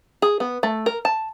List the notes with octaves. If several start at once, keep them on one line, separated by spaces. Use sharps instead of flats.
G#4
B3
A3
A#4
A5